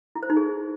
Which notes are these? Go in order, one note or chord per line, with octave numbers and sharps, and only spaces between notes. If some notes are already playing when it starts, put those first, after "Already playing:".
E4
C5
D#4
G#4